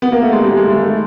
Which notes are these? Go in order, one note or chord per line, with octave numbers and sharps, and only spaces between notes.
B3
A#3
A3
G#3
G3
G#3
A3
A3